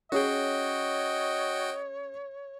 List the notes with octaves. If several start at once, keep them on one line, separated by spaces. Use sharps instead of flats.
C#4 F#4 G#4 C#5 D#5 G5